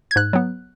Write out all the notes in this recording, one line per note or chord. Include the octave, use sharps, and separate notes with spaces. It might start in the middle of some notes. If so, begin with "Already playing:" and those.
G#6
G#2 F#6
F#3 B3